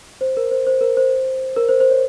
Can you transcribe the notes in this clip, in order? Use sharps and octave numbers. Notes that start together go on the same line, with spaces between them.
C5
A#4
C5
C5
A#4
C5
A#4
C5
C5
C#5